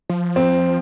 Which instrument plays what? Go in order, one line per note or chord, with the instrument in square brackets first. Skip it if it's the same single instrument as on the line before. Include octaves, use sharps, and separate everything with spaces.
[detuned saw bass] F3
[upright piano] C4